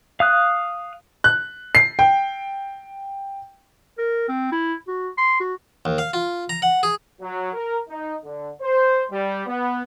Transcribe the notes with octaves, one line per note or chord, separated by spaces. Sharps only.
F5 D#6 F#6
F#6
C7
G5
A#4
C4
E4
F#4
C6
F#4
D#2
F5
F4
A#5
F#5
G#4
F#3
A#4
D#4
D3
C5
G3
B3